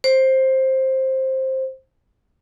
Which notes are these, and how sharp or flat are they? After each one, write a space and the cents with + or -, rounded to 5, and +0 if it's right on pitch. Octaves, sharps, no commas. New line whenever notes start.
C5 +10